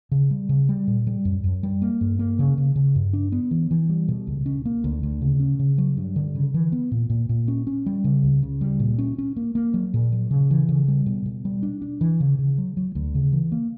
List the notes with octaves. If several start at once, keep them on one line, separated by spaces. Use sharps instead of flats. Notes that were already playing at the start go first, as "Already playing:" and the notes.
C#3
G3
C#3
G3
A#2
G3
F#2
F#2
G3
A#3
G2
A#3
C#3
C#3
C#3
G2
D4
B3
E3
E3
G3
B2
C#2
C#4
A#3
D2
D2
C#3
C#4
C#3
F#3
G2
D3
C#3
E3
B3
A#2
A#2
A#2
C#4
C#4
G3
C#3
C#2
C#3
G3
A#2
C#4
C#4
A#3
A#3
F#3
A#2
F#3
C#3
E3
C#3
G3
B2
B2
G3
D4
D4
E3
C#3
C#3
F#3
F#3
D2
C#3
E3
A#3